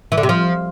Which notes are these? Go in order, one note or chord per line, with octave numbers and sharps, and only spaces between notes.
E3
D3
C3
F3